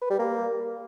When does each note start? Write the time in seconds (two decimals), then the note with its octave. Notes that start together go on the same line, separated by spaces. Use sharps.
0.02 B4
0.10 G3
0.19 A#3